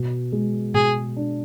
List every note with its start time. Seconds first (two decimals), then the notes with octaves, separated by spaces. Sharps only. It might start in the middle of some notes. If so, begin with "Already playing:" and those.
Already playing: B2
0.32 G#3
0.74 B2 G#4
1.16 D4